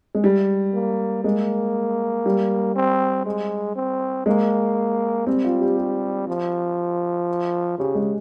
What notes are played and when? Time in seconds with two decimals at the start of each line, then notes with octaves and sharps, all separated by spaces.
0.15 G#3
0.24 G3
0.74 A#3
1.24 G#3 A#3
2.26 G3
2.76 C4
3.26 G#3
3.76 C4
4.26 G#3 A#3
5.27 G3 C4
5.44 F4
5.61 G4
5.77 G4
6.28 F3
7.78 C#3 G4
7.95 G#3